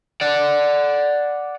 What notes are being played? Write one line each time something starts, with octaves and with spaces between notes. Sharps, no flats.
D5 F#5